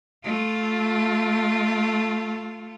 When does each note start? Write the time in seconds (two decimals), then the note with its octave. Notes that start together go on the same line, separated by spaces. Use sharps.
0.24 A3 F4